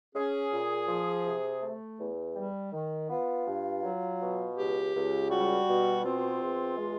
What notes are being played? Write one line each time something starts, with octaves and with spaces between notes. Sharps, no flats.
C#4 G#4
A#2
F3
C3
A3
E2
G3
D#3
B3 F4
G2
F#3
B2
C#2 G4
C#2
G3 F#4
B2
C4 F4
E2
G#3